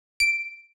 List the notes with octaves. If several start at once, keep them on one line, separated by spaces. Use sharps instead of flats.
D7